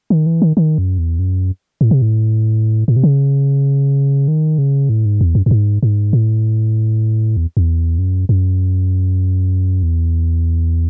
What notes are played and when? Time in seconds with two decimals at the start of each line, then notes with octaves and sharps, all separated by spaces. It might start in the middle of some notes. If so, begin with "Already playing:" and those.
0.10 D#3
0.26 E3
0.42 D#3
0.57 D#3
0.78 F#2
0.98 E2
1.19 F#2
1.81 A2
1.91 C3
2.02 A2
2.88 A2
2.96 C3
3.04 C#3
4.28 D#3
4.58 C#3
4.89 A2
5.05 G#2
5.21 E2
5.35 F#2
5.46 F#2
5.51 G#2
5.83 G#2
6.13 A2
7.37 E2
7.57 E2
7.98 F#2
8.29 F#2
9.83 E2